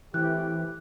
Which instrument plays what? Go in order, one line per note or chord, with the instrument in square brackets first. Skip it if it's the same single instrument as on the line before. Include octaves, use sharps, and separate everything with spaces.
[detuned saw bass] E3 [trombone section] A3 C4 G4 [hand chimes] F#6